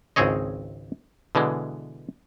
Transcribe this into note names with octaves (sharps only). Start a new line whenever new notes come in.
G#1 C#2 C4 G#4 C#5 D#5
B2 D3 E3 G#3